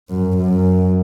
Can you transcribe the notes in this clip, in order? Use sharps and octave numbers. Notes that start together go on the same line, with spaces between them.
F#2
F#2